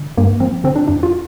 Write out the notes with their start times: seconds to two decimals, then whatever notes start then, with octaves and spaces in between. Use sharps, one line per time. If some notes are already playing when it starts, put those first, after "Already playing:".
Already playing: D3
0.17 G2 A#3
0.40 F3 C4
0.64 D3 C4
0.76 D4
0.88 F2 D4
1.03 F4